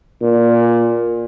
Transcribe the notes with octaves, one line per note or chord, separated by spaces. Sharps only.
A#2